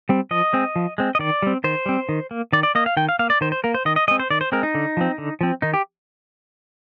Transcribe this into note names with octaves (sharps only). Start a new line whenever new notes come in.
G3 C4
F3 D#5
G#3 C4
F3
G#3 C4
D#5
D#3 D5
G3 C4
D#3 C5
G3 C4
D#3
A#3
D#3 D5
D5
A#3 D#5
F5
D#3 G5
F5
A#3 F5
D5
D#3 C5
C5
A#3 A#4
C5
D#3 D#5
D#5
G#3 C4 D#5
C5
D#3 D5
C5
G#3 C4 A#4
D#4
D3
F3 C4
D3
F3 C4
D#3 D#4
G4